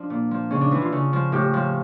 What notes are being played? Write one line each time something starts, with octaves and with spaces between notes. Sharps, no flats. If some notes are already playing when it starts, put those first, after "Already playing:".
Already playing: F3 D4
A#2
F3
C#3 C#4
D4
E3 E4
F4
C#3
F3
A2 G4
F3